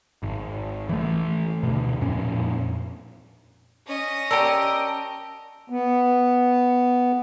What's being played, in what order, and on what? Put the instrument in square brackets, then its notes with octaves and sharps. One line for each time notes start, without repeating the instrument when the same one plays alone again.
[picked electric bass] G#1
E3 A3
D2 B2
F2 A#2 C#4
[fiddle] C#4 D#5
[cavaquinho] G4 A#4 [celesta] D5 A5 E6
[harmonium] B3